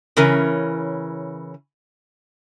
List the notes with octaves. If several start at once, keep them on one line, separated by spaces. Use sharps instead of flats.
C#3 E3 C#4 A#4